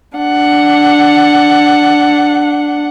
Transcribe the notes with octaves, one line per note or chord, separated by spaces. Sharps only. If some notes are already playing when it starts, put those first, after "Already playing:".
D4 F#5